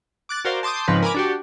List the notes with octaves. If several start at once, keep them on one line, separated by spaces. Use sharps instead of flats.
D6 F#6 A6
F#4 A#4 C5 D5 F5
A5 C6 D6 D#6 G6
G#2 C#3 F3 C4 D#4 B4
A#4 G#5 B5 D6
D4 F#4 G4